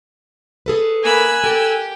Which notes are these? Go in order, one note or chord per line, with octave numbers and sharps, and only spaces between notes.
G#4 A4 B4
A#3 G#5 B5 E6 F#6
G4 A4